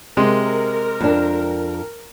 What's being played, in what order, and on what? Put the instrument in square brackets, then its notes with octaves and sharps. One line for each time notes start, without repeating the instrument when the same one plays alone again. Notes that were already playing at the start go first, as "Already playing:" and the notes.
[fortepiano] C3 G#3 [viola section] A#4
[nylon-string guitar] F2 D4